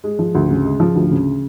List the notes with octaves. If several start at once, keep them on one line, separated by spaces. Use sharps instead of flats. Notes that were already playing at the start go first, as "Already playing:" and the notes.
G#3
F3
D2
C#3
G#3
F3
D2
C#3